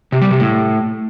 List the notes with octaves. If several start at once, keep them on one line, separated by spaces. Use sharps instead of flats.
C3
G3
C3
A2